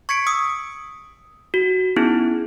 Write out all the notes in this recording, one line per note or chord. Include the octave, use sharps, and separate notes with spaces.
C#6 G#6 B6 C#7 D7
D#6 E6 C#7
F#4
B3 C#4 D#4 E4 G#4